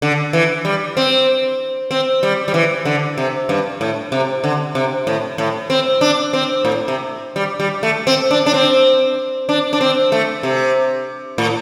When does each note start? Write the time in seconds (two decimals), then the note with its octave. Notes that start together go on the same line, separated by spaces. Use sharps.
0.02 D3
0.33 E3
0.65 G3
0.97 C4
1.91 C4
2.23 G3
2.48 G3
2.54 E3
2.85 D3
3.18 C3
3.49 G2
3.81 A2
4.12 C3
4.44 D3
4.75 C3
5.07 A2
5.38 A2
5.70 C4
6.01 D4
6.33 C4
6.65 A2
6.88 C3
7.36 G3
7.60 G3
7.83 A3
8.07 C4
8.31 D4
8.46 D4
8.54 C4
9.49 D4
9.73 D4
9.81 C4
10.12 A3
10.43 C3
11.38 A2